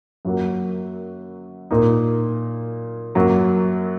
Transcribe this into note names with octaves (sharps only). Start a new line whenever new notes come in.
F#2 F#3 A#3 F#4
A#2 A#3 D#4
F#2 F#3 A#3